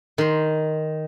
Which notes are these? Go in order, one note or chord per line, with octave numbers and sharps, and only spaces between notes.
D#3 C6